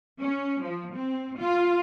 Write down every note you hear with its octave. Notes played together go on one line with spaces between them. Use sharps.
C#4
F3
C4
F4